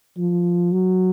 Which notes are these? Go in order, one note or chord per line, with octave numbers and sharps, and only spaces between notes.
F3
F#3